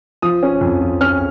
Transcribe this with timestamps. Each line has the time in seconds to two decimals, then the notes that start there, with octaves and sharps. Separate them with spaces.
0.22 F3 D#6
0.43 C#4
0.61 F2
0.81 F3
1.01 C#4 F6